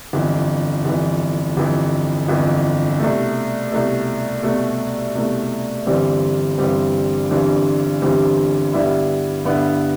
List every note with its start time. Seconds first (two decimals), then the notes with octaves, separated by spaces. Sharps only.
0.13 G1 F2 E3
0.85 G1 F2 E3
1.57 G1 F2 E3
2.28 G1 F2 E3
3.00 C2 B2 A3
3.71 C2 B2 A3
4.43 C2 B2 A3
5.15 C2 B2 A3
5.87 G1 G2 E3 G3 C4
6.58 G1 G2 E3 G3 C4
7.29 G1 G2 E3 G3 C4
8.02 G1 G2 E3 G3 C4
8.73 G2 D3 G3 B3 E4
9.45 G2 D3 G3 B3 E4